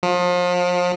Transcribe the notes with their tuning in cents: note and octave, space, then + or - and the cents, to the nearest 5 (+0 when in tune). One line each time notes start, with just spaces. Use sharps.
F3 +35